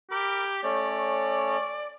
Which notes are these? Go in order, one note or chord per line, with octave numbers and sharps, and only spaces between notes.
G4 A#4 B5 D6
A3 C#4 C#5 D5